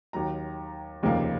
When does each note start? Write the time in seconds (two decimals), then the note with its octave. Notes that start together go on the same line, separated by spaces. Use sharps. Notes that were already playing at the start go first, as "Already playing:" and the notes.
0.13 D#2 D#3 F#3 A#5
1.03 F1 D#2 C#3 F3 A#3